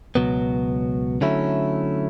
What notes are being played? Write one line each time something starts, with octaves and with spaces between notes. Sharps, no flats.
C#2 B2 F#3 B3
D3 F#3 A3 C#4 E4